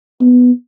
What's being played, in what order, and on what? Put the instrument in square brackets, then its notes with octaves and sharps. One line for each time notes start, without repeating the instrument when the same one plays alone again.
[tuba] B3